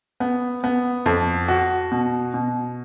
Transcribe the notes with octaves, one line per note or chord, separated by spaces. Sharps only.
B3
B3
F2
F#4
B2
B2